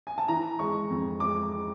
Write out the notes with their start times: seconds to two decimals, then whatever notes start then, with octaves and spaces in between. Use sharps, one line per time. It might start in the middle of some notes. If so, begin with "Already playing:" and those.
0.07 G#5
0.18 A5
0.28 E3 A#5
0.59 G#3 C#6
0.90 F2
1.20 G#3 D6